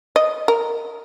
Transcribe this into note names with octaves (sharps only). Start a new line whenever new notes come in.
D#5
A#4